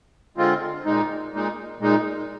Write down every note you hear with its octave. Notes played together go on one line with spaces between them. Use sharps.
D3 G#3 C4 F4
A#2 G#3 D#4
A#2 G#3 D#4
A#2 G#3 D#4